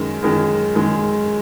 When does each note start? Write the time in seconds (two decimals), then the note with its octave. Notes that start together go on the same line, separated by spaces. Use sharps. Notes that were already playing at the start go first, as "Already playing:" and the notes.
Already playing: F#2 D#3 G#3
0.22 F#2 D#3 G#3
0.75 F#2 D#3 G#3